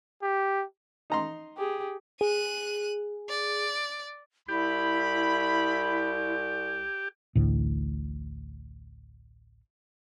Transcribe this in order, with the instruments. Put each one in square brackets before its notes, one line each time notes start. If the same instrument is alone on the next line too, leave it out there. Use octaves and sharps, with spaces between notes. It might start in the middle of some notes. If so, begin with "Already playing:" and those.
[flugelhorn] G4
[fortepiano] D#4 A#5 C6
[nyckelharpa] G4 G#4
[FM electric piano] G#4 [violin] F#6 D#7
[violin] D5
[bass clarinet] C2 [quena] E4 [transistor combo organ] G4 [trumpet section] B5
[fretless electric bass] A1 D2 A2